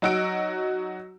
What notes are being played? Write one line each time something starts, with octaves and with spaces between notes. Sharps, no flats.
F#3 D#4 F#4 E6 D7